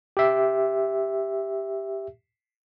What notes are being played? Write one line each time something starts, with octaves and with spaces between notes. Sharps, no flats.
G4 E5